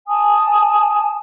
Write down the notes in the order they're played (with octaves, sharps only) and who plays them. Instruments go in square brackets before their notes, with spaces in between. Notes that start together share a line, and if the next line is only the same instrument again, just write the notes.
[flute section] G#5 A5 D#6